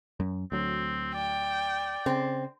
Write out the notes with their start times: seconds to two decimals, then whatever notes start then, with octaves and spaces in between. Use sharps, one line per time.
0.20 F#2
0.52 D2 F#3 C4
1.15 D5 G5
2.06 C#3 C4